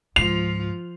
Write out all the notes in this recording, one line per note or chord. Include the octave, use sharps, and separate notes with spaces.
C#2 G#2 F3 F4 C7 F7